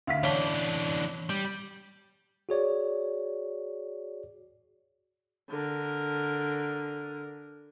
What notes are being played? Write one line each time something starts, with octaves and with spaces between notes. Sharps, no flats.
D2 F5 B6
E3 D4 C#5 A5 G7
G3
F#4 G#4 C#5 D5
D3 A#4